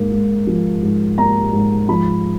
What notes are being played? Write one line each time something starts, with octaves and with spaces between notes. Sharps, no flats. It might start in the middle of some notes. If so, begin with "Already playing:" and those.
Already playing: G#2 A#3
G#2
F3
G#2
A#3 A#5
G#2
F3 B5